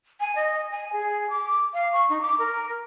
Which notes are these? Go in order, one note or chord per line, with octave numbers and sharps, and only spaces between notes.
G#5
D#5
G#5
G#4
D6
F5
C#6
D#4
D6
A#4